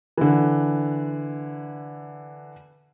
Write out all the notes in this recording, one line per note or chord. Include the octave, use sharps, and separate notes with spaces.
D3 E3